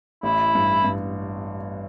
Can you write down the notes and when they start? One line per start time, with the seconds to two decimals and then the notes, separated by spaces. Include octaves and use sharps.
0.23 A1 E4
0.55 G2
0.84 G2